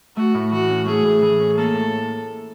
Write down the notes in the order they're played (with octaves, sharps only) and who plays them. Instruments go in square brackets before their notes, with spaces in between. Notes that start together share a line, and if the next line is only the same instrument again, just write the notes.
[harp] A3 [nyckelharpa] F#4
[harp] A2
[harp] E3 [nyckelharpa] F#4
[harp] C#4
[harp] A3 [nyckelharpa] G#4
[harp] A2
E3
C#4
[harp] A#3 [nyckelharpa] A4
[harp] A2